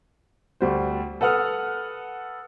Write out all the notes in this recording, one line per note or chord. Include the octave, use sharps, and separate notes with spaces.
D2 G3 C5
A4 B4 F#5 D#6 F6